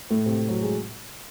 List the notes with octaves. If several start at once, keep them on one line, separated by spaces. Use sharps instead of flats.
A2 A3
C3 C4
F#3
G#3